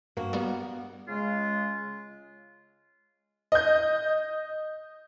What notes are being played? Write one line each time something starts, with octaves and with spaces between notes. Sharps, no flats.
G2 A#3 F#4
G3 B3
C#3 G#3 F4
D#5 G6